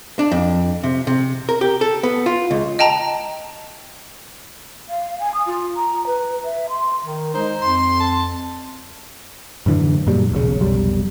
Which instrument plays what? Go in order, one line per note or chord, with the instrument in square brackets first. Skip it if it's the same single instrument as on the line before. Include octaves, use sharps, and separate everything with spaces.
[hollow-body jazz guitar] D4
F2
C3
C3
A#4
G4
A4
B3
F4
C#2
[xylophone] D#5 G5 A5 A#5
[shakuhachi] F5
G#5
D#6
F4
A#5
B4
E5
C6
[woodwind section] D#3
[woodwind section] G#3 D#4 [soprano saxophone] C5
[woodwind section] F2 [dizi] C6
[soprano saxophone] A5
[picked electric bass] F#2 A2 D3 E3
F#2 A#2 F#3 G3
E1 B1 A2 C#3
F1 B1 G3